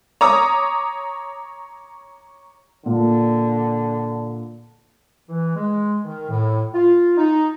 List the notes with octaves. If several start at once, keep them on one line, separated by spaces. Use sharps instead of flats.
C#5 A#5 D6 D#6
A#2 D3
E3
G#3
D#3
A2
F4
D#4